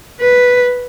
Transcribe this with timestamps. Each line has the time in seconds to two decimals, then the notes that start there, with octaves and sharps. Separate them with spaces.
0.21 B4